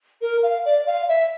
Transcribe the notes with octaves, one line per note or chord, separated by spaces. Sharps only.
A#4
F5
D5
F5
E5